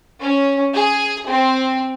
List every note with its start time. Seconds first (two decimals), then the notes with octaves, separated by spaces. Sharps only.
0.21 C#4
0.74 G#4
1.28 C4